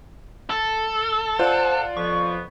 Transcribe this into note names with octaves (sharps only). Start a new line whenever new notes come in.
A4
F4 C5 D5 F#5
F2 F3 B3 C#6